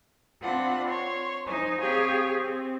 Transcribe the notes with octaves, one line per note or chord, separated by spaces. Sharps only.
C4 D4 F4 F#5 B5
C#5 C6
D#4 C5 G#5
C4 G4 G#4 C#5 F5
C4